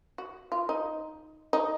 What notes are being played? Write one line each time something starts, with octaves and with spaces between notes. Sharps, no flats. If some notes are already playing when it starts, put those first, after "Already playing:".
F#4
F4
D#4
D#4